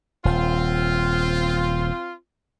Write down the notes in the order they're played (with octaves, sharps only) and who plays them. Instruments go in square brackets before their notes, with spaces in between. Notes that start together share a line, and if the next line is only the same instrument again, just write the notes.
[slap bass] D#1 [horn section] C4 F4